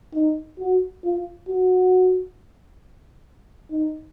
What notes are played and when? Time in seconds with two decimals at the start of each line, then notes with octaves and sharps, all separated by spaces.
0.14 D#4
0.59 F#4
1.04 F4
1.48 F#4
3.71 D#4